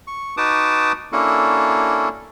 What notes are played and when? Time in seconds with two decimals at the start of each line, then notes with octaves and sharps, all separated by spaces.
0.07 C#6
0.37 D#4 F#4 B4 A5 D6 D#6
1.12 A#3 C#4 D4 E4 F#4 A4